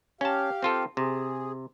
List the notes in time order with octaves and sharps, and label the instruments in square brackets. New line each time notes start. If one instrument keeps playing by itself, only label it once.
[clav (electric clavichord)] C#4 A5 [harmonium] G4 F5
[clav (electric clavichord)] C4 F4 A4
[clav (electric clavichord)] C3 [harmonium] G#4